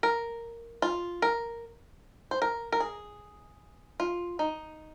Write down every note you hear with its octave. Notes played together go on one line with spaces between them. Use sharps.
A#4
F4
A#4
C5
A#4
A#4
G#4
F4
D#4